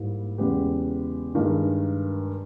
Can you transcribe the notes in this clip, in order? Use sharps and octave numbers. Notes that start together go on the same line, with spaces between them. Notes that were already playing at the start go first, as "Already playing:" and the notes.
Already playing: G#2 G3 A#3 E4 G4
E2 C#3 G#3 B3 G4
G2 D#3 G#3